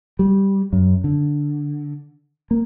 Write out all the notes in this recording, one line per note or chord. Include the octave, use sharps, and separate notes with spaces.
G3
F#2
D3
A#3